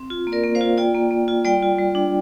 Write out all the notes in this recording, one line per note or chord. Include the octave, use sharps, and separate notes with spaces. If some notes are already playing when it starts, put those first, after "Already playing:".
Already playing: C4
F4
A#3
A#4 D5
A#3
C5 F5
F4
F4 D5 G5
A#3
A#3
F4
G3 D5 G5
F4
G3
D4